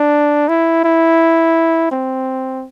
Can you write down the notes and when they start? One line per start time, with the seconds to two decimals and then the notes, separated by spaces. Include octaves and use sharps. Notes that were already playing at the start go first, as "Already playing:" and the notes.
Already playing: D4
0.48 E4
0.84 E4
1.91 C4